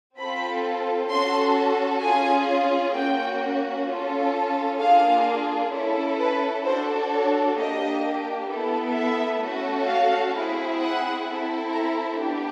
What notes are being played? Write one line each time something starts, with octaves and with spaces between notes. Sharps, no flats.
C4 F4 A4 B5
C#4 F#4 A4 C6
C#4 F4 G#4 G#5
A#3 C#4 F#4 G5
C#4 F4 A4
A#3 D4 F4 G#4 F5
C#4 E4 A4
B4
D4 F#4 A4 C5
C#5
A#3 D4 G4 D#5
B3 E4 A4
E5
A3 C#4 F#4 A4
F5
C4 E4 G#4
F#5
C4 E4 A4
A#5
B3 D4 G4